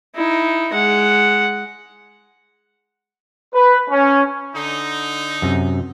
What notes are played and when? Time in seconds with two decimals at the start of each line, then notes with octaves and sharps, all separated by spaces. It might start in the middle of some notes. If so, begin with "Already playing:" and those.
0.15 D#4 E4
0.73 G#3 F#5
3.54 B4
3.90 C#4
4.55 D3 D#4
5.42 F#2 C3 F#3